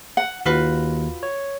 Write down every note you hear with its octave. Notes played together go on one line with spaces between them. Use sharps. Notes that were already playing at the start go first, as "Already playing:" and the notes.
F#5
D#2 F4 F#4 B4
C#5